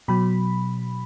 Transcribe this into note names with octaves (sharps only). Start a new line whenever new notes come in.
B2 F#3 B5